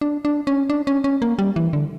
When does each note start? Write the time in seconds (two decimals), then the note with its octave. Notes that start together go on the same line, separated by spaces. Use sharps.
0.01 D4
0.25 D4
0.47 C#4
0.70 D4
0.87 C#4
1.04 C#4
1.22 A#3
1.39 G3
1.56 E3
1.73 D3